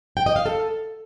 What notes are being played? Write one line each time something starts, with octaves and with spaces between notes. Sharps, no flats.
G5
D#5
F5
A4